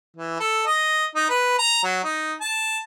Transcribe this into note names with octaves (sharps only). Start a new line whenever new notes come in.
E3
A4
D#5
D#4
B4
A#5
F#3
D#4
A5